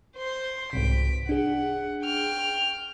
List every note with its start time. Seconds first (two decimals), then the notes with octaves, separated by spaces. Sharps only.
0.16 C5 C6
0.73 C2 G#2 C3 B6 D7
1.29 D4 G#4 F#5
2.05 G5 F6